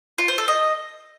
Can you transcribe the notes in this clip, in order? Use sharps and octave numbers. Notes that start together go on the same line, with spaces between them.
F4
C5
A4
D#5